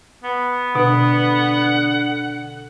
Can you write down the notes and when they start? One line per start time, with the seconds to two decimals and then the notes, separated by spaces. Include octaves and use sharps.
0.24 B3
0.75 B2 D3 F#5